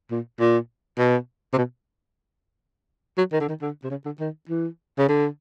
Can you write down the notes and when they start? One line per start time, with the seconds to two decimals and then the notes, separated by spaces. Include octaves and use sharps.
0.11 A#2
0.40 A#2
0.98 B2
1.54 C3
1.58 B2
3.18 F#3
3.32 D#3
3.40 D3
3.48 D#3
3.62 D3
3.84 C3
3.90 C#3
4.06 D3
4.20 D#3
4.49 E3
4.98 C#3
5.09 D3